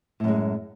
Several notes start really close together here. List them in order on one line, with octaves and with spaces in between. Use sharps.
A2 F#2 G#3